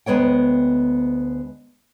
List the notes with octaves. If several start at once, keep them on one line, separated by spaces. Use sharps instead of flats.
D2 G#3 B3 C#5 G5